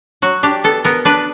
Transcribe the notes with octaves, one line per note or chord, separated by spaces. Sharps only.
F#3 F#4
D4 G4
B3 A4
B3 A#4
D4 B4